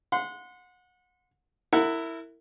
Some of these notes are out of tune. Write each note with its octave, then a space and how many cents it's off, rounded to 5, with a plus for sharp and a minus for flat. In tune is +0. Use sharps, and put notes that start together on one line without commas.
F#5 -30 C6 -20
E4 +0 A#4 -35 F#5 +0